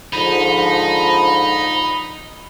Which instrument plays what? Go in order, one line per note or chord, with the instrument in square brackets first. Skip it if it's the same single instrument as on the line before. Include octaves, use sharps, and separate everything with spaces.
[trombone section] G#2 D3 F3 [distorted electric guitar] D#4 [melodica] B5